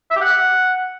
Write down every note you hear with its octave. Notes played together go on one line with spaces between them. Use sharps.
E5
G4
F#5